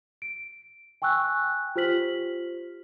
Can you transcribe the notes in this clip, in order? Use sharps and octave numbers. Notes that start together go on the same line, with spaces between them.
D7
G5 G#5 C#6 E6 F#6
F4 G4 C5 F6 B6 F#7